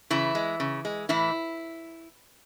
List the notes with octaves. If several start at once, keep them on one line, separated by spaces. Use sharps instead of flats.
C#3 E3 E4
G#3
C#3
G#3
A2 E3 E4